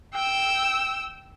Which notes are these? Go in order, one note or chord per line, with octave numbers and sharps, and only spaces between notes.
G5 E6